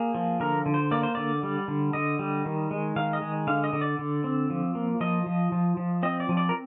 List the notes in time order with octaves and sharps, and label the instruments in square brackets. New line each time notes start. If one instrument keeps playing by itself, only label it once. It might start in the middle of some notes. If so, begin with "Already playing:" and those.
Already playing: [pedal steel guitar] A#3 G#4
F3
D3 A#4
D3
C5
A#3 D5
C5
D3 D5
G3
D3
D3 D#5
G3
D#3
G#3
D#3 F5
D#5
G#3
D3 F5
D#5
D3
D5
D3
C4
F3
A#3
F3 D#5
F3
F3
F3
C4 D#5
D5
F3
D5
A#4